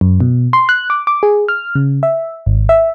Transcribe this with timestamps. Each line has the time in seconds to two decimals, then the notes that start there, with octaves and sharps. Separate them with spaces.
0.01 F#2
0.20 B2
0.53 C6
0.69 F#6
0.90 D6
1.07 D6
1.23 G#4
1.48 F6
1.75 C#3
2.03 E5
2.46 G#1
2.69 E5